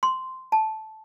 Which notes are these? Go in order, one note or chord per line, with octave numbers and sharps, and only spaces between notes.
C6
A5